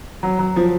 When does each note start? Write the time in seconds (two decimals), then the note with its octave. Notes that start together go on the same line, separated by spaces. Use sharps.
0.23 F#3
0.39 F#3
0.56 F3